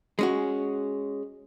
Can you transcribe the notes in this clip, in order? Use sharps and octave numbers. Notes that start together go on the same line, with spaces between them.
G#3 C#4 F#4